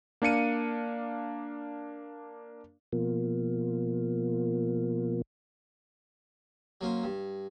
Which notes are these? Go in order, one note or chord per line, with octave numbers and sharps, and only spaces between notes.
A#3 D4 F5 C#7 D#7
B2 F3 A#3
F#3 A#3 C#4 C5
G2